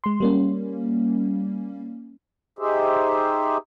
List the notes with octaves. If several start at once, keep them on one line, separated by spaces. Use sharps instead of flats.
G#3 C6
G3 A#3 C#4
D#4 G4 G#4 C5 E5